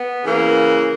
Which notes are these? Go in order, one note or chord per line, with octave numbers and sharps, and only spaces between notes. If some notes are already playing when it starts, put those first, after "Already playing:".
Already playing: B3
C#3 E3 A#3